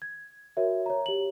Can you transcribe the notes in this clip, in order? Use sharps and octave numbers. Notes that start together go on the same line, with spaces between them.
G#6
F#4 A#4 C#5 E5
C#5 A#5
G4 F#7